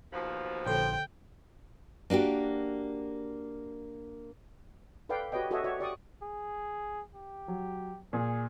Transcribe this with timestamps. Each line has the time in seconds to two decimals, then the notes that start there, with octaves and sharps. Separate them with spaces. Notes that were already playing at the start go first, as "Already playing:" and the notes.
0.13 D#2 B2 F3
0.67 A#1 D3 A4 C5 C#5 G5
2.10 A#3 D4 F#4 G4
5.09 A4 B4 D5 F5 G5
5.32 F#4 G4 B4 C#5 D#5 G5
5.51 F#4 G#4 A4 C#5 D#5 E5
5.64 F#4 C#5 D5 E5
5.79 G4 D5 C#6 D#6
6.22 G#4
7.15 G4
7.48 F#3
8.13 A#2 G#4